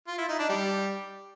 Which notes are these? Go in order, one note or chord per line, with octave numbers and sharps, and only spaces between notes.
F4
E4
D#4
D4
G3